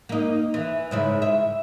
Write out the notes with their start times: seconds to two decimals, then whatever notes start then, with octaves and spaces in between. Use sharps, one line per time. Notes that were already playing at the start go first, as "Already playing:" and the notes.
0.09 A#3 D#4
0.54 E3
0.91 G#2 C#3 E4
1.22 E5